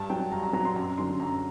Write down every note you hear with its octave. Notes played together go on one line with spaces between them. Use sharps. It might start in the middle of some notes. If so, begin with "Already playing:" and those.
Already playing: G2 A5
F#3 G5
G2 A#5
A#5
F#3 A#5
C6
F#2 A#5
D3 F#3 C6
F#2 A#5